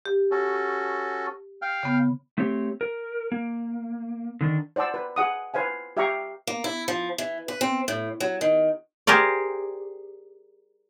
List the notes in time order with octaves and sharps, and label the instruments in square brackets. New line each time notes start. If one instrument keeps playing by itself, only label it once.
[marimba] G4
[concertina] C#4 F#4 A4
F5 G5 F6
[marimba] C#3 B3
[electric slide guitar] A3 C4 G4 C#5
A#4
A#3
D3 D#3 D4
[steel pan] C5 D5 F#5 A5 E6
B4
G#4 F#5 D#6
B4 C5 F5 G#5
G4 E5 F5 G5 A#5 C#6
[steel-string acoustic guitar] A#3
E4
F3
E3
B4
C4
A2
F#3
D#3
[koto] G4 G#4 A#4 C5 D5